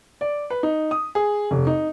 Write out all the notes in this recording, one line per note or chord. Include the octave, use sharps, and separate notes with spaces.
D5
B4
D#4
D#6
G#4
F1
D#4